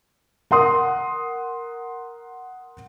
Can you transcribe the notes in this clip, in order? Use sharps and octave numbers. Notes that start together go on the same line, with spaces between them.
A#4 F#5 C6 D#6